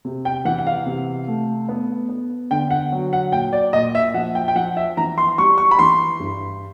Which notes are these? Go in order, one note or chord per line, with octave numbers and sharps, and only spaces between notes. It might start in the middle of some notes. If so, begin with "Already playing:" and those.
C3
G5
E3 F#5
F#5
F5
C3
A3
B3
B3
D3 G5
F#5
F#3
F#5
A#2 G5
D5
A#2 D#5
E5
F3 F#5
G5
G5
F3 F#5
E5
E3 A#5
C6
G3 C#6
C#6
B5
E3 C6
G2